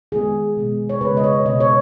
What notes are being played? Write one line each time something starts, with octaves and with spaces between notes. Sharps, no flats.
D#3 G#3 B3 G#4
B2 G#3 B3
C#5
C#3 G#3 B3 B4
D#5
C#5
B2 B3 D#5
C#5